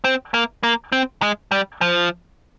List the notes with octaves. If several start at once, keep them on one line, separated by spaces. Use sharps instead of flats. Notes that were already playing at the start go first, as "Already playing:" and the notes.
C4
A#3
A#3
C4
G#3
G3
F3